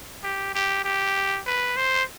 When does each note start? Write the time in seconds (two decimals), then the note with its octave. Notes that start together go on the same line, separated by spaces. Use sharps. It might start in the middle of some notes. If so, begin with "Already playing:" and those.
0.23 G4
0.54 G4
0.85 G4
1.46 B4
1.77 C5